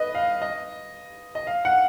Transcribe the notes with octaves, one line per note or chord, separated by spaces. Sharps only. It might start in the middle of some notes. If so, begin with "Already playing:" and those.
Already playing: B4 D#5
F5
D#5
D#5
F5
F#5